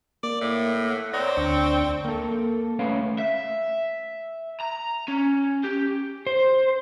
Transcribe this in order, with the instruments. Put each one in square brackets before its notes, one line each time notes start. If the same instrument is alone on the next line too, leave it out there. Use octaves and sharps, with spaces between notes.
[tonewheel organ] A#3 [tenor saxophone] D5
[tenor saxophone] A2
[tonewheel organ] F#5
[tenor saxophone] C4 [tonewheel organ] C#5 D5 A#5
[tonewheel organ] D2 D4 C#6
[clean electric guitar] A#3 A4
A3 C#4 B4 C#5 F5
[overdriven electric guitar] E5
A#5
C#4
G4
[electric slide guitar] C5